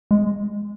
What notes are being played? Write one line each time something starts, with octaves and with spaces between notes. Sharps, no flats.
G#3